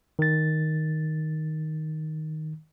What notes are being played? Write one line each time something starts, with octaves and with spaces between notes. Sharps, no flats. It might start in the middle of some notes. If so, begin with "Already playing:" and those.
D#3 A6